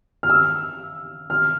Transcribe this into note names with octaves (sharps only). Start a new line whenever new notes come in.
F6
E6
F6